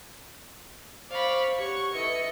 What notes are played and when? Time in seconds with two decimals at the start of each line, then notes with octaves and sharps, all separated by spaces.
1.10 C5 D5 F5 B5 C#6
1.59 G4 C#5 F#5 C#6
1.93 E4 A4 B4 D#5 C#7